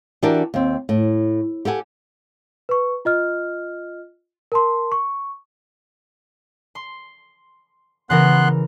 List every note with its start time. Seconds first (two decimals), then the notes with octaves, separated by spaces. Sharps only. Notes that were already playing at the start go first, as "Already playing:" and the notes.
0.23 E3 D4 F#4 G4 A#4 A5
0.54 D#2 C4
0.89 A2
1.65 G4 A4 F#5 G#5
2.69 B4 C#6
3.05 F4 D#5 F6
4.52 A#4 A5 C6
4.92 C#6
6.75 C6
8.10 C#3 E3 B3 A#4 C6 F#6